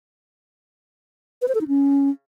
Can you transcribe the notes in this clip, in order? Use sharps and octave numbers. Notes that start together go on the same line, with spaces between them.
B4
C5
A4
D#4
C#4